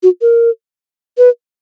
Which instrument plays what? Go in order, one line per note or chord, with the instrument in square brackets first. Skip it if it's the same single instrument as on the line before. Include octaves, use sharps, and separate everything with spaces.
[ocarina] F#4
A#4
B4